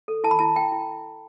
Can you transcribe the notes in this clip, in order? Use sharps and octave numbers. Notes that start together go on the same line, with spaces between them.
A4
E4 A5
B5
E4 A5
E4 G5
E4